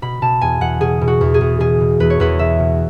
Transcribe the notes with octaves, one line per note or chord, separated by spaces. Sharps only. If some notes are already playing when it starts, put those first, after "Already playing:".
B2 B5
B2 A5
E2 G#5
E2 F#5
B2 G#4
B2
F#4
E2
G#4
E2
B2 G#4
B2
E2 B4
C#5
E2 B4
B2 E5
B2